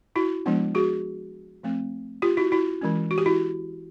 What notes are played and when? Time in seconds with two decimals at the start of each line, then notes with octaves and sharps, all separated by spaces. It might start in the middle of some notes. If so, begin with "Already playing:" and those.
0.16 E4 F#4
0.46 F3 G#3 B3 D4
0.75 F#4 G#4
1.63 F3 A3 C4
2.22 F4 G4
2.37 E4 F#4
2.52 E4 F#4
2.81 E3 G#3 C#4
3.11 F#4
3.18 G4
3.26 E4 F#4